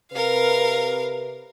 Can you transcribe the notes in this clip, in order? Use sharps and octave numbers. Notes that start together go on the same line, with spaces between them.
C3 A#4 B4 F5